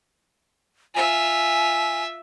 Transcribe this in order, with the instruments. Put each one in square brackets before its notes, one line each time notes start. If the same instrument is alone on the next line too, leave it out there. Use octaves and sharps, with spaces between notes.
[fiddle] F4 E5 [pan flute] G#5